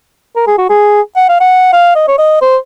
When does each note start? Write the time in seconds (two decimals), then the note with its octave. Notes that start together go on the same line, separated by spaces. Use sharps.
0.36 A#4
0.47 G#4
0.58 F#4
0.70 G#4
1.16 F#5
1.29 F5
1.41 F#5
1.73 F5
1.96 D#5
2.08 C#5
2.18 D#5
2.42 C5